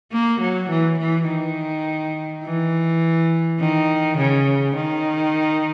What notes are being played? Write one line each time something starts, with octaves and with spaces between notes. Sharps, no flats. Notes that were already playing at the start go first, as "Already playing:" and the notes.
A#3
F#3
E3
E3
D#3
E3
D#3
C#3
D#3